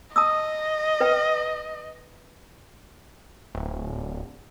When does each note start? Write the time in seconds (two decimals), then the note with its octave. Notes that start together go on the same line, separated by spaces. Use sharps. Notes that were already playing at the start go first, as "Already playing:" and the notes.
0.16 D#5 A5 D#6 E6
1.01 B4 G5
3.55 D1